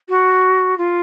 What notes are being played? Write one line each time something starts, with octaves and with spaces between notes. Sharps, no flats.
F#4
F4